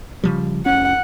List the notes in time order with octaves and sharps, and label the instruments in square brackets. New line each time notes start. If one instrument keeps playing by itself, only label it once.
[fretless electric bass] C#3 F3 G3
[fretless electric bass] F1 C#4 [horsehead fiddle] F#5